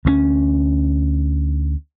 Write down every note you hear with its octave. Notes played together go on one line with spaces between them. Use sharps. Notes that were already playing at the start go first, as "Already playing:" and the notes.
D2 A3 C#4